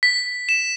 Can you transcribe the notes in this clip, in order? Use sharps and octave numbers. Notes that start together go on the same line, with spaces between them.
B6
E7